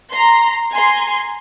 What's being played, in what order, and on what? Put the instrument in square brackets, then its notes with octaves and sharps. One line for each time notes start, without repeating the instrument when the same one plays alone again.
[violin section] A#5 C6
G#5 A#5 C6